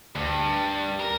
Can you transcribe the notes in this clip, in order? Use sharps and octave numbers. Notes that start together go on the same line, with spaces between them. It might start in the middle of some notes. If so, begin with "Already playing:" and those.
D2 G2
A#4